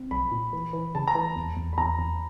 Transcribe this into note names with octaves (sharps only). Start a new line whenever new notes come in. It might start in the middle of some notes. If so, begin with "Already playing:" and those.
Already playing: C4
B1 B5
A#2
E3
E3
C#3 A5
A#5
E3
A5
E2
E2
B5
E2 A#5
E2